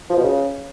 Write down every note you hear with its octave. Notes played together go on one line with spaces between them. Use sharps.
F3
B2
C#3